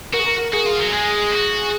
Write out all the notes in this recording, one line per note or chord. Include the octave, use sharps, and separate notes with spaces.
F#4 A#4
G#4
A#4
F#4 G#4
F4
F#3
G#3
F#4